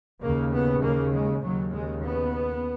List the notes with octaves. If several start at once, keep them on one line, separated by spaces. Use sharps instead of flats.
D#2 C#3 A#3
B3
A#3
G#3
D#2 C#3 F#3
G#3
B3